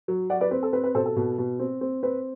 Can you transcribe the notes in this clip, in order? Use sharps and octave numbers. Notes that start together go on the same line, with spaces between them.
F#3
F#3 D5 F#5
B4 D5
C4 B4
A4
C4 B4
B4
B2 A4 C5
A4
B2
B2
C4
C4
C4 B4